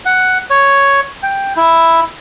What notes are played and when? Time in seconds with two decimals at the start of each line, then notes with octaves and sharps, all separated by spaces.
0.06 F#5
0.50 C#5
1.23 G5
1.57 E4